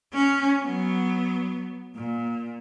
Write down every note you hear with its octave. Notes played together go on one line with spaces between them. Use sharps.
C#4
F#3 B3
A#2